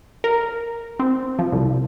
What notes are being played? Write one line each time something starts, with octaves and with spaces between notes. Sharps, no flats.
A#4
C4
F3
C2